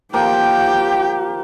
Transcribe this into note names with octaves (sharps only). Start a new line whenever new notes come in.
F3 A#3 G4 G5 D6